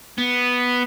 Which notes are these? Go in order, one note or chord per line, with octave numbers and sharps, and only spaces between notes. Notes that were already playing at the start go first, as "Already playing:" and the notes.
B3